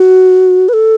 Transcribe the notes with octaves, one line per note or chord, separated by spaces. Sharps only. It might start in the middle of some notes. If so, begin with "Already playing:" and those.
Already playing: F#4
B4
A4